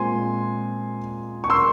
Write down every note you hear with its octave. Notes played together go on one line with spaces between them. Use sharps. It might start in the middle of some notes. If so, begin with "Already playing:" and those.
Already playing: A#2 G#3 C4 G#5 C6
C#6
C6 E6